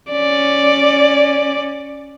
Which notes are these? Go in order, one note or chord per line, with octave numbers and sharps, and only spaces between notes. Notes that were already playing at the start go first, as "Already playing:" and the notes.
C#4 D5